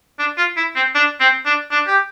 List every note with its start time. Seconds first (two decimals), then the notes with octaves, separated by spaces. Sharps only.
0.19 D4
0.38 F4
0.57 E4
0.76 C4
0.95 D4
1.20 C4
1.46 D4
1.71 D4
1.87 G4